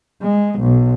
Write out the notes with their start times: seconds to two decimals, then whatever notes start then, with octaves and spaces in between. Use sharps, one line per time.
0.22 G#3
0.60 B1